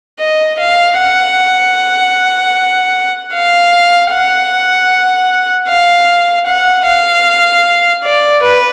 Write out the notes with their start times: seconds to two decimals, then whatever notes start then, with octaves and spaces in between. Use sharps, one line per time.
0.20 D#5
0.59 F5
0.97 F#5
3.33 F5
4.11 F#5
5.68 F5
6.47 F#5
6.86 F5
8.04 D5
8.42 B4